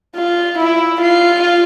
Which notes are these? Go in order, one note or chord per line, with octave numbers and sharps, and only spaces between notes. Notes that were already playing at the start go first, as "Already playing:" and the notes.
F4
E4
F4